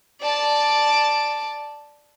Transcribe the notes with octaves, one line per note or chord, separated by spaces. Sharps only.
D5 A5